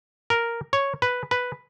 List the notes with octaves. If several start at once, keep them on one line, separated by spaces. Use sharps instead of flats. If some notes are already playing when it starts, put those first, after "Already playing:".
A#4
C#5
B4
B4